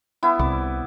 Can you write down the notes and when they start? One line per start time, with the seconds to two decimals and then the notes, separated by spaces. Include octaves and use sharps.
0.23 B3 E4
0.39 C2 D6